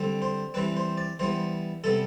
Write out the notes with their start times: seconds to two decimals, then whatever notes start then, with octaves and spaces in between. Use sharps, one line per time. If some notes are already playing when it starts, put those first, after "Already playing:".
Already playing: D3 G3 C4
0.22 C5
0.54 E3 G3 C4 B4
0.77 C5
0.97 D5
1.19 E3 G3 B3 C5
1.84 C3 G3 B3 A4